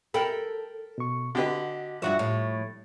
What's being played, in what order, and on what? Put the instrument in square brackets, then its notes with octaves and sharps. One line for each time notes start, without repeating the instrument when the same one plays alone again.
[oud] A4 [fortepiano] A#4 G5 B5
[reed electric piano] B2 C#6
[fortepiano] D3 G4 B4 [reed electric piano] F#4 D#5
[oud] G2 F#4 E5 [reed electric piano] F3 C#6
[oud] A2